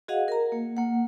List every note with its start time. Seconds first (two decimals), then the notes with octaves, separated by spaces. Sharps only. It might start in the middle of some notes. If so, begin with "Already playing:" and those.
0.08 F#4 G#4 D#5 F5 F#5
0.28 A#4 A#5
0.52 A#3
0.77 A#3 F#5